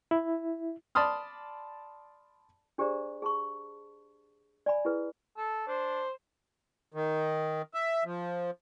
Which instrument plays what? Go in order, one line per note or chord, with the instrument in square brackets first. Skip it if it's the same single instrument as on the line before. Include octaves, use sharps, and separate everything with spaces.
[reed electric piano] E4
[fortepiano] D5 A5 B5 C6 D#6 F6
[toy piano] D4 G4 G#4 C5 D5 A#5
G#4 A5 B5 C#6
D5 G#5 B5
E4 G#4 B4
[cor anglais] A4
[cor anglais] D4 [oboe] C5
[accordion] D#3
E5
F3